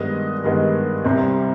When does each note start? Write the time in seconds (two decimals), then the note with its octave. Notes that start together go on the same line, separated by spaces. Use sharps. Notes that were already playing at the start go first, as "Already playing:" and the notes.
Already playing: G2 D#3 G#3 B3 D#5
0.44 G2 D#3 G#3 B3
1.05 C2 C3 G3 C4